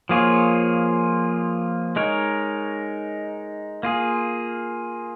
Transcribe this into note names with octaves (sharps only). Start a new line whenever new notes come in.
F3 A#3 F4 G#4 C#5
G#3 D#4 A#4 C#5
A#3 F4 G#4